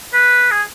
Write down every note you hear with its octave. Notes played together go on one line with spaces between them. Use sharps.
B4
G#4